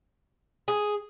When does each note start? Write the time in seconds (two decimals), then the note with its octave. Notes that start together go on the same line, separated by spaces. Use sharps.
0.68 G#4